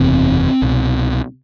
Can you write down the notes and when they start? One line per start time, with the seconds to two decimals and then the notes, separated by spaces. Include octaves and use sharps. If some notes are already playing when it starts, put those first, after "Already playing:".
Already playing: F#1 E2 C3 C4
0.62 C2 B2